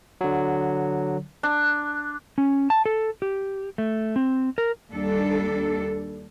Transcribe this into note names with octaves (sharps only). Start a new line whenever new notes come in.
D3 F#3
D4
C#4
A5
A4
G4
A3
C4
A#4
D#2 G3 D4 A4